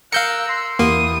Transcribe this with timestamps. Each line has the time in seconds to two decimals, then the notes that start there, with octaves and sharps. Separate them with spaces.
0.12 A#4 F5 E6 F#6 G6 C#7
0.49 C6
0.79 E2 A#3 G4 D#6